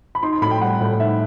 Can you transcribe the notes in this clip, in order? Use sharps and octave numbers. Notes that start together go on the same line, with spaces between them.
B5
D#4 C6
C6
A2 B5
G5
G3 F#5
A2
D#4 E5